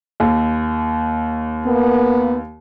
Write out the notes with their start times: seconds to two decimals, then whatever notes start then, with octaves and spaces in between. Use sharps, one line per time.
0.20 D#2
1.66 A#3 B3